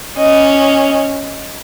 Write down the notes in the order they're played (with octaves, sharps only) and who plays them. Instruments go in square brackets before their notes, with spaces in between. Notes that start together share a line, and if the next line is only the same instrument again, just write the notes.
[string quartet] C#4 [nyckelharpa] D#5
[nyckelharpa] D#5